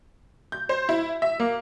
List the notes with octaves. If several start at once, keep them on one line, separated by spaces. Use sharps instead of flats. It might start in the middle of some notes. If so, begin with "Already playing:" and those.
G6
C5
E4
E5
A#3